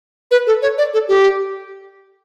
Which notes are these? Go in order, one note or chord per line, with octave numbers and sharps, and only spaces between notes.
B4
A4
C#5
D5
A4
G4